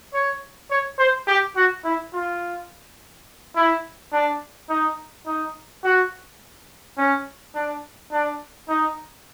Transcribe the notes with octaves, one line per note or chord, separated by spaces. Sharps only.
C#5
C#5
C5
G4
F#4
E4
F4
E4
D4
D#4
D#4
F#4
C#4
D4
D4
D#4